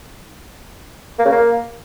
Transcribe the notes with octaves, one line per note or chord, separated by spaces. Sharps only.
A#3
C#3
A#3